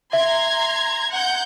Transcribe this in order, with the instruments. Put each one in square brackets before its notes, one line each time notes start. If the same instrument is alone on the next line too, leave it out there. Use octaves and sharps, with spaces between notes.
[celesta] E5 [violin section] A#5 C6 G#6
[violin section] F#5 G6